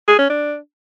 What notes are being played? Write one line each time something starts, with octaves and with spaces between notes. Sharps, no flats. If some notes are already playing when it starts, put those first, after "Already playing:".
G#4
C#4
D4